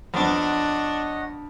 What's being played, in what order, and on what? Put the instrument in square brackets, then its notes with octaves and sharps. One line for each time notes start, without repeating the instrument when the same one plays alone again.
[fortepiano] F2 B3 [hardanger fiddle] D4 [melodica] C#5 D#5 F#5